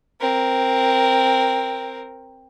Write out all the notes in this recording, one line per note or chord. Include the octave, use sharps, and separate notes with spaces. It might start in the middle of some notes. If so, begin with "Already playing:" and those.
C4 A#4